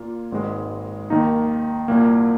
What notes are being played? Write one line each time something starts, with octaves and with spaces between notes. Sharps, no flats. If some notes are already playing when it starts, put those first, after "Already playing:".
Already playing: A#2 A#3 F4
G#1 G#2 G#3
D#2 D#3 A#3 D#4
C2 A#2 A#3